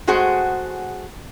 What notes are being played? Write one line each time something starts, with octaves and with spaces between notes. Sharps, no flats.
G#3 A3 F#4 G#4 C5 F#5